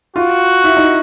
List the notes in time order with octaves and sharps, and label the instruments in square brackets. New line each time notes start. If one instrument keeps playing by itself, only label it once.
[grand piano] F4 [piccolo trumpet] F#4
[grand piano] E4
D#4